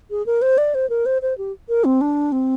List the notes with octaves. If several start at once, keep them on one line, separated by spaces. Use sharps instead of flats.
G#4
A#4
C5
D5
C5
A#4
C5
C5
G4
A#4
C4
D4
C4